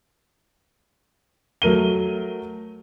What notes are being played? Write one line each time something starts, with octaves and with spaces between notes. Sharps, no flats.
F#3 A3 A#4 D#7 G7